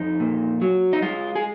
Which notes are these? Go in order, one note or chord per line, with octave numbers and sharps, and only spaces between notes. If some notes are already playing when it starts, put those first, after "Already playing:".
Already playing: F2 D#4
A#2
F#3
D#4
G#3 F4
G#4